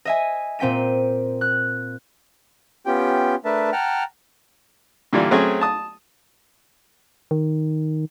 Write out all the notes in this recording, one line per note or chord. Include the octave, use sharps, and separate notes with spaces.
D#5 E5 G#5
A#2 C4 G5 B6 D#7
F#6
B3 C#4 F4 G4 G5
A3 D4 A#4 B4 E5 A5
F#5 G5 A5 A#5 F6
A#2 D3 E3 G3 D4 F4
F#3 A3 C4 C#4 F#4 G#4
A5 D#6
D#3